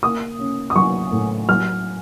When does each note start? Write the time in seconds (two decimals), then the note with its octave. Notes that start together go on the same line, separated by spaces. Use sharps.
0.03 A#3 D#6
0.39 C#4
0.70 D#6
0.76 F#3 C#6
1.12 A2
1.49 F#3 F6